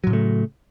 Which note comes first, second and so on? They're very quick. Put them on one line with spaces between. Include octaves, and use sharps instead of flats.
F#3 A2 C#3 A3